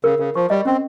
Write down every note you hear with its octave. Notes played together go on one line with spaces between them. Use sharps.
C#3 A#4
C#3 A#4
F3 C#6
G3 D#5
C4 C#4